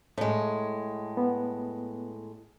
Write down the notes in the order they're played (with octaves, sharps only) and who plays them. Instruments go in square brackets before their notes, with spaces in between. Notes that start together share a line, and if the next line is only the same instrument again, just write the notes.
[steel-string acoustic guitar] A2 G#3
[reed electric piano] B3